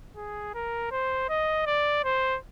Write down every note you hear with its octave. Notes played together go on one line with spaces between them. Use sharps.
G#4
A#4
C5
D#5
D5
C5